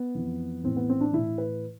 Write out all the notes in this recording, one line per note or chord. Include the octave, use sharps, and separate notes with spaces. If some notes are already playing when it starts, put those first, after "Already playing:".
Already playing: B3
F2 E3
A2 E3 C4
B3
C4
D4
A2 E3 E4
B4